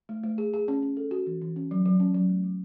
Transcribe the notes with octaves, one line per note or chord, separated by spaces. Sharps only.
A3
A3
G#4
G#4
C#4
C#4
A4
F#4
E3
E3
C#4
F#3
F#3
C#4
F#3
A3
F#3